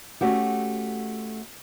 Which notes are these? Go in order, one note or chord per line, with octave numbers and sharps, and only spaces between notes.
A3 C#4 F#4 G4